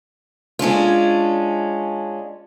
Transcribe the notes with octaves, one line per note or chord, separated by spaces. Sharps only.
G#3 C#4 D4 F4